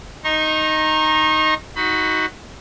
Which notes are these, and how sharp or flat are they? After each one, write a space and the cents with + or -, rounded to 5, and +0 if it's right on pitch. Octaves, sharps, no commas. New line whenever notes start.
D#4 +0 A#5 +0 C#6 -40
D#4 +20 F#4 +0 B5 +30